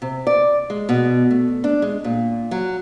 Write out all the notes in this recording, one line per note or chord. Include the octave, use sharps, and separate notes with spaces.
C3
D5
G#3
B2
A3
D4
G#3
A#2
F#3